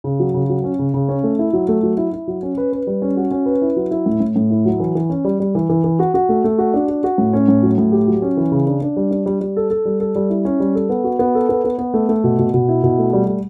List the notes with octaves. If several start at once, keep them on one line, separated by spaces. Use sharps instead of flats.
C#3
F#3
C#3
F#3
C#4
C#3
C#3
C#4
A3
E4
F#3
A3
F#3
E4
E4
F#3
C#4
B4
B4
G3
C#4
F#4
C#4
B4
E4
F#3
E4
A2
A2
A2
E4
F#3
E3
E3
C#4
G3
G3
E3
E3
E3
F#4
F#4
A3
A3
F#4
D4
F#4
F#4
A2
C#4
A2
F#3
A2
G4
F#3
C#4
E3
C#3
D4
D4
G3
D4
G3
G3
A4
A4
G3
A4
G3
E4
C#4
G3
A4
B3
F#4
B3
A4
B3
B3
B3
A3
A3
B2
B2
B2
E4
B2
A3
G3
G3